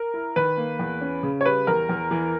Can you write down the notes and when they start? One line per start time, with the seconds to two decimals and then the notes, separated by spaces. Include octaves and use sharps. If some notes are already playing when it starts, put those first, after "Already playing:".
Already playing: A#4
0.14 E4
0.36 D#3 B4
0.57 A#3
0.79 E2
1.01 C#4
1.23 C#3
1.41 C#5
1.45 G3 B4
1.67 E2 A#4
1.89 E2
2.11 E3